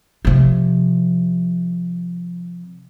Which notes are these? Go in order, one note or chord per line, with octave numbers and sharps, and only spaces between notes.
C3 F3